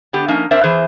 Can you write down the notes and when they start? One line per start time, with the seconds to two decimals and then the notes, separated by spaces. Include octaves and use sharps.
0.13 D3 B3 G4
0.28 F3 A#3 C#4 D#4
0.51 C4 D4 A#4 C5 E5
0.64 E2 E3 G#4 C5